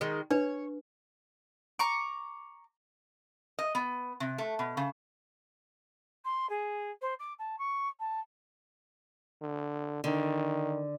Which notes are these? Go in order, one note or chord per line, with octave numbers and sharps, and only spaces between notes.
D#3 G#3
D4 B4 C#5
A#5 C#6 D6
D#5
B3
C3
A3
B2
C#3
C6
G#4
C5
D6
A5
C#6
A5
D3
D3 D#3